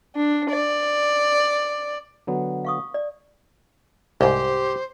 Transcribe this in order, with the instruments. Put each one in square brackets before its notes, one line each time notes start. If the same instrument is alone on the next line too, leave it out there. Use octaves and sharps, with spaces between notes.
[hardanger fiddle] D4
D5
[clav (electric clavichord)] D3 F#3 B3
[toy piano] F5 C#6 D#6
D5
[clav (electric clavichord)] C2 G#2 [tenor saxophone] G4 [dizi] C5